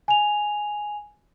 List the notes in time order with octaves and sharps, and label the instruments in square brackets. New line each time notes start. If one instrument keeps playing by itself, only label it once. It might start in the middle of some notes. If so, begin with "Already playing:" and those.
[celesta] G#5 F7